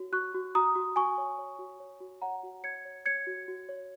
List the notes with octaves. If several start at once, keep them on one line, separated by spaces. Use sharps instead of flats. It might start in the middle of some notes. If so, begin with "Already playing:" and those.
Already playing: F#4 C#5
F#4 C#6 F#6
F#4
F#4 A#5 D#6
F#4
F#4 G#5 C#6
C#5
C#5
F#4
C#5
F#4
C#5 F#5 A#5
F#4
C#5 G#6 C#7
C#5
C#5 G#6 C#7
F#4
F#4
C#5